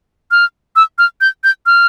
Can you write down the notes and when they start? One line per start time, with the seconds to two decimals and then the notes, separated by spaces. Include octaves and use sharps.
0.31 F6
0.76 E6
0.98 F6
1.21 G6
1.44 G6
1.66 F6